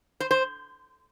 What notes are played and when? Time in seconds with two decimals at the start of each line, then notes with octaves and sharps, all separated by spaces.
0.20 C5
0.31 C5